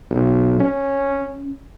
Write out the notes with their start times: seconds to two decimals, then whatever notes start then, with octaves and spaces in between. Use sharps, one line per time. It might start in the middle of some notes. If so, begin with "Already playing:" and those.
0.11 B1
0.60 C#4